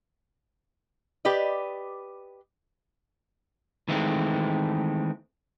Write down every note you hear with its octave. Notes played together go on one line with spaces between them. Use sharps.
G4 B4 D5 D#5
D#3 E3 G#3 A3 C4